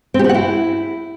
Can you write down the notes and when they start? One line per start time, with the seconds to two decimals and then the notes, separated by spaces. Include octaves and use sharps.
0.14 C4
0.19 G4
0.24 F#4
0.29 F#5
0.34 E4